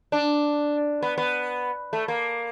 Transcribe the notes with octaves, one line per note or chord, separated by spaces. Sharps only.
D4
B3
B3
A3
A#3